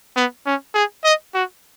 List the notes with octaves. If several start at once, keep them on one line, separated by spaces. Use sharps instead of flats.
B3
C#4
G#4
D#5
F#4